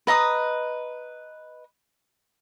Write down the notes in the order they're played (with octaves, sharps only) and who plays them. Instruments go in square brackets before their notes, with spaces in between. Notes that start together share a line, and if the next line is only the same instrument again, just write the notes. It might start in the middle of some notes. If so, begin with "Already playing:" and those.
[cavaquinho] B4 D#5 A#5 D#6